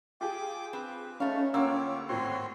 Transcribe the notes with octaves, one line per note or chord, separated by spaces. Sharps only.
F4 G4 G#4 G5 D6
C4 B4
A3 C#4 D#4 F5 C#6
D2 A#3 F4 G4 C#5 E6
G#1 A2 C4 F#4 C#5 C6